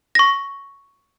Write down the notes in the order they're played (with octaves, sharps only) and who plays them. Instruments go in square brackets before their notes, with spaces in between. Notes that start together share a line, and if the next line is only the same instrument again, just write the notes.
[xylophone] C#6 A#6